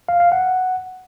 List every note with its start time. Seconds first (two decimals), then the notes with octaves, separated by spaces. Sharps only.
0.09 F5
0.20 F5
0.32 F#5